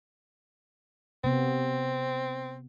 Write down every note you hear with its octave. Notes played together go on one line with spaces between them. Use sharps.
C3 B3 C4